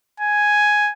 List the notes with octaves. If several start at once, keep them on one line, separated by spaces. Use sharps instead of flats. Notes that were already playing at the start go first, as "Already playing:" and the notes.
G#5